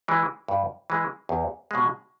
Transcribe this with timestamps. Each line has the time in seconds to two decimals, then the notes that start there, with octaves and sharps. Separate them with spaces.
0.08 E3 G#3
0.48 G2
0.90 E3 G#3
1.29 E2
1.71 B2 G#3